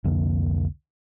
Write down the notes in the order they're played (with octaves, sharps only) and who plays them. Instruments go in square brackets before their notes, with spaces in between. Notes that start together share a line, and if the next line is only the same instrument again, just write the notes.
[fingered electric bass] C2 F2 D3 A#3